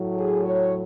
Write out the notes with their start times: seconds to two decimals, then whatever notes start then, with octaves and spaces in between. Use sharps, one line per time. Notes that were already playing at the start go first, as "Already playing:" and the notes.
Already playing: A2 F#3
0.16 G#4
0.44 C#5